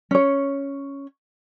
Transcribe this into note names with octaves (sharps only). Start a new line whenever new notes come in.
C#4 C#5